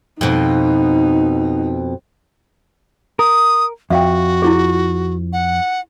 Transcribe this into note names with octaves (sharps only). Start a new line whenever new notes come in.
F2 B2 D#4
A#4 D#6
F2 F#4 E5 F5 G5
E4 F4 G#4
F#5